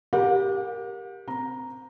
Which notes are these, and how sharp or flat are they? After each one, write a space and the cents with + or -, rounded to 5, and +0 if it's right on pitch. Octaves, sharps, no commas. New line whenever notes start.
G4 +0 A#4 +0 F#5 -45
C4 -20 A#5 +0